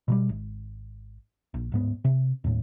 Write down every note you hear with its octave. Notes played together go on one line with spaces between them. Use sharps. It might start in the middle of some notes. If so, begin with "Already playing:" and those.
B2 F#3 G3
G#1
A#1
D1 G#2 B3
C3
D#2 A2